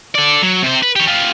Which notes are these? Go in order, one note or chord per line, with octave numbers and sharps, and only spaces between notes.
A4 D5
F#3
C3 C5
B4
G4 C#5
F4 G4